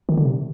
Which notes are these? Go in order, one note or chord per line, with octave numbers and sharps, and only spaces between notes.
D#3
D3
C3